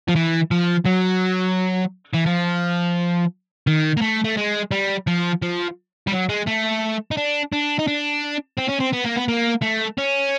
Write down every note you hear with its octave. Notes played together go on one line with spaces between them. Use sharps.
F3
E3
F3
F#3
E3
F3
D#3
A#3
A3
A3
G#3
G3
F3
F3
G3
F#3
G#3
A3
D#4
D4
D4
D#4
D4
C4
C#4
C4
B3
A#3
B3
A#3
A3
C#4